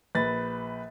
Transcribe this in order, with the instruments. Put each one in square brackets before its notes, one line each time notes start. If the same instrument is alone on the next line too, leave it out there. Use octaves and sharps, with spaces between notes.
[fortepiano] A#1 [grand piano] B4 A6